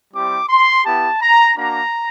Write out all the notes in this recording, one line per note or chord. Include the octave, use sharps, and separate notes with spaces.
G3 C4 E4 G4 D6
C6
B3 E4 G4 A5
A#5
A#3 D4 F#4 A#5